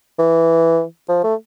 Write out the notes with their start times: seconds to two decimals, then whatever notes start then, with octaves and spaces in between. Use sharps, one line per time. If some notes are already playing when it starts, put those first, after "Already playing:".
0.19 E3
1.09 F3
1.24 A3